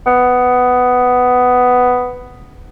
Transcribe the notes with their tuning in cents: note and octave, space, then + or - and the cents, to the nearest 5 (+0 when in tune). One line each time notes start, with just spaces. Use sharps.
B3 +10